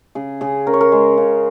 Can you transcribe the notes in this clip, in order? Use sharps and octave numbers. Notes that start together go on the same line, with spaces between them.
C#3 G#4
C#3 G#4
C#4 A#4
C#5
A#4
G#3
C#3